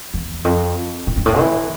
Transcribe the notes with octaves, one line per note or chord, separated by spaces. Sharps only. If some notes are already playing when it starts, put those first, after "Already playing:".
E2
F2
A2
G2
A2
E3